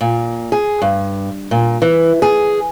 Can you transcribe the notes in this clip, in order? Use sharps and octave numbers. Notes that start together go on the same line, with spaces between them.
A#2
G#4
G2
A#2
E3
G#4